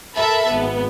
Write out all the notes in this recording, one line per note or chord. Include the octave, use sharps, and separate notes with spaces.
A4 A#4 E5 A5 B5
G#1 B3